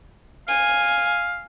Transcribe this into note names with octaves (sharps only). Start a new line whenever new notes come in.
F5 G#5